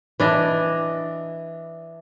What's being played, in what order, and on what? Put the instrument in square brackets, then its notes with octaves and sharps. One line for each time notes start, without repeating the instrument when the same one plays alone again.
[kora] E3 D4 D#5